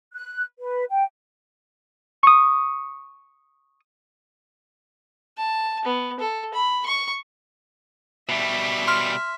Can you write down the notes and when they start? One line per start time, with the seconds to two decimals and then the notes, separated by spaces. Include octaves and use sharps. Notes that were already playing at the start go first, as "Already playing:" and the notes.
0.14 F#6
0.59 B4
0.90 G5
2.23 C#6 D#6
5.37 A5
5.85 B3
6.19 A4
6.54 B5
6.86 C#6
8.29 B2 G3 E5
8.88 C6 F6